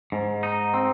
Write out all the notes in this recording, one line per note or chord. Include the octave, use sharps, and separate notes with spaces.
G#2
D#4
C4